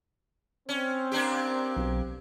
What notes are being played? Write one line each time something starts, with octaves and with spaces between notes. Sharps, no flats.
C4 C#4
A#3 D4 G4
B1